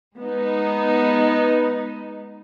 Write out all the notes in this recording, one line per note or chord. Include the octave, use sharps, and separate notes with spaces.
G#3 B3 D#4